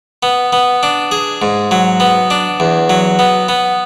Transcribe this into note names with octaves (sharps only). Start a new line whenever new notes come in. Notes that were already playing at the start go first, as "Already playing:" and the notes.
B3
B3
D4
G#4
G#2
F#3
B3
D4
E2
F#3
B3
B3